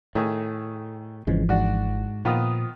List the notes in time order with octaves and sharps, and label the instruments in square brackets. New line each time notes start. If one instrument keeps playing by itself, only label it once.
[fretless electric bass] A2 [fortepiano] D#3 A3 G#4
[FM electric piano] G#1 E3 F3 [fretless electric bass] F2 C#3 G#3
[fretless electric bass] G#2 [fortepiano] D4 F#4
[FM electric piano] A#2 D#6 [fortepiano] D#3 B3 F4 [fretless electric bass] F3